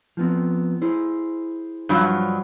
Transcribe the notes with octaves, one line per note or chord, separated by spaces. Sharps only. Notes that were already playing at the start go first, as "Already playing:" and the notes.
F3 B3 C4
E4 G#4 C5
G2 F3 F#3